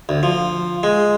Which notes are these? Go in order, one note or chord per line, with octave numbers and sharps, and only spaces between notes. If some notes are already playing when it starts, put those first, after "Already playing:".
D2
F3
G#3